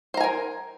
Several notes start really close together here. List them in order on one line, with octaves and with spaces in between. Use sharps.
C5 A#5 G#5 A#4